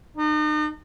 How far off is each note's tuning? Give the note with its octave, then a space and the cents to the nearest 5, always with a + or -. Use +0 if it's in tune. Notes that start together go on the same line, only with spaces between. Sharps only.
D#4 -40